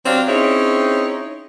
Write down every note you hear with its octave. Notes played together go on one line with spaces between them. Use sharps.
F#3 C4 D4 G4 C#5 F5
C4 C#4 D#4 E4 G#4 C#5